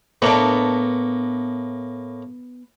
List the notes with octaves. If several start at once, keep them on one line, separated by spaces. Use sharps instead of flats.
A2 A#3 B3 D4